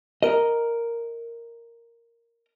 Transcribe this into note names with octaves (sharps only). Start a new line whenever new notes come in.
A#4 D#5